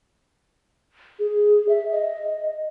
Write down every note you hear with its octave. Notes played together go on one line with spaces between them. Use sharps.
G#4
E5
D#5